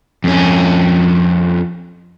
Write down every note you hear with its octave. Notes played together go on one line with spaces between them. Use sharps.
F2 C#4